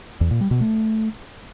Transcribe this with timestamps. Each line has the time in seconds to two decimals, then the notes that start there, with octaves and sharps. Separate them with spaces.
0.21 E2
0.31 A#2
0.41 G3
0.51 B2
0.61 A3